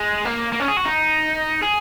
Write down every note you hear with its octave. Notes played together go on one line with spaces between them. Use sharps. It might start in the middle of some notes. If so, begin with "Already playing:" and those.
Already playing: G#3
A#3
A#3
C#4
G#4
F#4
D#4
G#4